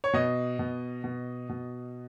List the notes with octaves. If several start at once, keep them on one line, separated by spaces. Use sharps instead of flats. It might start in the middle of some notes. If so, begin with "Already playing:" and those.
C#5
B2 D#5
B2
B2
B2